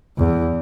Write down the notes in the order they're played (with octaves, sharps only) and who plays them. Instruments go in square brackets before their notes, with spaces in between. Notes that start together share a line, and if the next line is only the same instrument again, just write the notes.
[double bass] E2